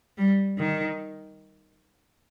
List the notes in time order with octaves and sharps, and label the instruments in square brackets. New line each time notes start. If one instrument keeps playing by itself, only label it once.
[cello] G3
D#3